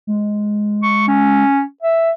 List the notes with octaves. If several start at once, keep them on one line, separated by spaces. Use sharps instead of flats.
G#3
C#6
C#4
E5